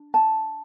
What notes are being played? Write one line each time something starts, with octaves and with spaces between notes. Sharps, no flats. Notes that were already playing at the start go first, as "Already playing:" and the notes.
Already playing: D4
A5